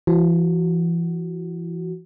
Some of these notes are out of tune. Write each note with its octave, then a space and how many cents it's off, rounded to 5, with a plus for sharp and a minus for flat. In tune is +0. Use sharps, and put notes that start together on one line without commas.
E3 +40 F#4 +10